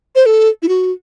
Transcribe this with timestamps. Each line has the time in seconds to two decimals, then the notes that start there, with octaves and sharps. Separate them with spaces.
0.15 C5
0.26 A4
0.62 E4
0.69 F#4